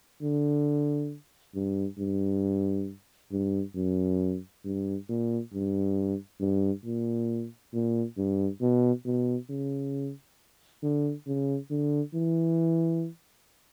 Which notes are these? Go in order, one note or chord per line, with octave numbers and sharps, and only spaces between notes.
D3
G2
G2
G2
F#2
G2
A#2
G2
G2
A#2
A#2
G2
B2
B2
C#3
D3
C#3
D3
E3